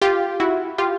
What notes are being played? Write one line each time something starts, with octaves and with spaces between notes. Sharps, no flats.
F4 G4
E4 F#4
F4 G4